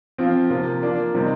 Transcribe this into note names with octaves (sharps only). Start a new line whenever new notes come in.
F3 C4 F4
C3 F3 A#3 F4
F3 A#3 D4 F4
C3 G3 C4 D#4